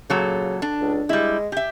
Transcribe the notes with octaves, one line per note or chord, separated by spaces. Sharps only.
A#2 C#3 F#3 A4
D4
C#2
G3 G#3 E4
G4 E5